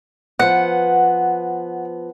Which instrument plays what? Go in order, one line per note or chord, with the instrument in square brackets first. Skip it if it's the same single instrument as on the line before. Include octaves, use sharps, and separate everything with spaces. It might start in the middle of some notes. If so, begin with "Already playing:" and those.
[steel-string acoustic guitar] F3 B3 [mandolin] F#5